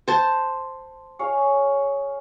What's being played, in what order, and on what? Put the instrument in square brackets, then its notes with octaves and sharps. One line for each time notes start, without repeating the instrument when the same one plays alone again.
[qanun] C5 A5
[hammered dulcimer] G#4 C#5 F5